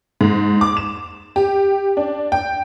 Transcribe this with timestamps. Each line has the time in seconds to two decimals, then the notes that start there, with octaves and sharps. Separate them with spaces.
0.21 G#2
0.61 D6
0.77 E7
1.36 G4
1.97 D4
2.32 G5